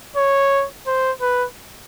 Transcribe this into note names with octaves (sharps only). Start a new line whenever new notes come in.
C#5
C5
B4